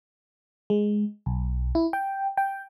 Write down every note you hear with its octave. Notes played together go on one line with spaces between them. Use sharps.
G#3
B1
E4
G5
G5